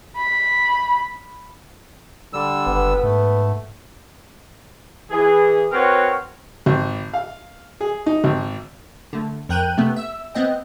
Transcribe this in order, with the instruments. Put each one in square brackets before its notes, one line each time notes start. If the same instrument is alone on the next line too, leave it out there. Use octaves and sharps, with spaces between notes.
[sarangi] B5
[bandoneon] D3 G3 E6
[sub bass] F#1 [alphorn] B3
[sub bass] G#2 [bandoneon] A3
[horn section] E3 G#4
C4 F#4 A#4 B4 C#5
[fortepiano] G#1
F5
G#4
D#4
G#1
[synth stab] D3 A3
F2 A#4 G5 F#6 G6 D#7
C3 A3 B3
E5 E6
B3 C4 D#5 G5